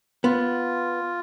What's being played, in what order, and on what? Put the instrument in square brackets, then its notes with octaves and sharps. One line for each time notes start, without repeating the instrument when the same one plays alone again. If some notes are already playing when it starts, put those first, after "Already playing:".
[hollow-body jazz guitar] B3 [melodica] F4